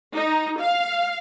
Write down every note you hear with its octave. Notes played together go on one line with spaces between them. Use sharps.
D#4
F5